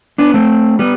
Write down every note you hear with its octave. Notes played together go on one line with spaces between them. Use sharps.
B3 D4
A3 C4
G3 B3